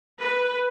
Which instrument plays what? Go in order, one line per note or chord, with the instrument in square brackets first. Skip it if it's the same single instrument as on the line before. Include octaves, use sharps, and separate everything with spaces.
[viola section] B4